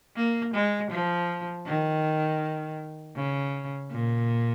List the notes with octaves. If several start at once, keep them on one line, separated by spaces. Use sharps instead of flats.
A#3
G#3
F3
D#3
C#3
A#2